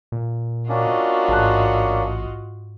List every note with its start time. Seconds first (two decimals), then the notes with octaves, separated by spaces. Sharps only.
0.12 A#2
0.69 A#3 C#4 D4 F4 F#4 D#5
1.28 A1 G#2 A5 F#6